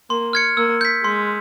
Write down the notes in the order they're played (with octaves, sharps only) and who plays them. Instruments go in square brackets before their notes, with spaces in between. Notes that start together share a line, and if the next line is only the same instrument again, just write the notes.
[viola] A#3 [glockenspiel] C6
[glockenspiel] F6 G#6 C#7
[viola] A#3 [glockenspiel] E6
[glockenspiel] G6 B6
[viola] G#3 [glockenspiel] C6